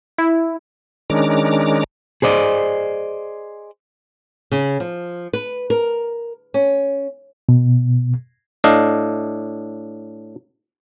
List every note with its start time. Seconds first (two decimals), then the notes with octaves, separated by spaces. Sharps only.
0.18 E4
1.10 D#3 G#3 C#4 D4 A#5 D6
2.22 G#4 C5 D5 D#5
4.51 C#3
4.80 F3
5.33 B4
5.70 A#4
6.54 C#4
7.49 B2
8.64 A2 D4 D#5 F5